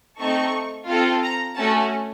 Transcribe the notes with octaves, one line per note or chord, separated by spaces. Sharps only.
A3 C4 D#4 A4 C#6
C4 F4 A4
A#5
A3 C#4 F#4 A5